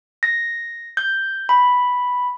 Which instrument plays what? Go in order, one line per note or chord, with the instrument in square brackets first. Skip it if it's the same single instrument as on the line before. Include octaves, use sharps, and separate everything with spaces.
[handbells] A#6
G6
B5